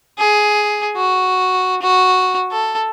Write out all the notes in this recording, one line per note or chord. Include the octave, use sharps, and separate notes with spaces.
G#4
F#4
F#4
A4